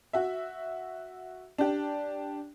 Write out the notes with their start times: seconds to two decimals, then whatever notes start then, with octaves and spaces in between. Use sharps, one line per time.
0.13 F#4 E5
1.58 D4 G4